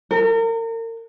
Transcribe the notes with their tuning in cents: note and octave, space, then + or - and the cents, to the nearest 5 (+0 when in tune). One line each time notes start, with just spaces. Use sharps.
A#4 -35